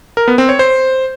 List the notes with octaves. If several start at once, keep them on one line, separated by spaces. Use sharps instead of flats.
A#4
B3
C4
C#5
C5